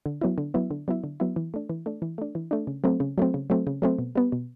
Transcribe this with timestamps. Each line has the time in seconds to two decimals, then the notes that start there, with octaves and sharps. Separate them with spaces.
0.06 D3
0.21 F#3 B3 E4
0.38 D3
0.54 F#3 B3 E4
0.71 D3
0.88 F#3 B3 E4
1.04 D3
1.20 F#3 B3 E4
1.36 E3
1.54 A3 D4
1.70 E3
1.86 A3 D4
2.02 E3
2.18 A3 D4
2.35 E3
2.51 A3 D4
2.67 C#3
2.84 F#3 A3 C4
3.00 C#3
3.18 F#3 A3 C4
3.34 C#3
3.50 F#3 A3 C4
3.67 C#3
3.82 F#3 A3 C4
3.99 B2
4.15 G3 B3
4.32 B2